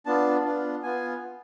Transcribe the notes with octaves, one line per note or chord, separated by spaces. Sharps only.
B3 D4 F4 A5
B3 D4 F4
B3 F4 G#5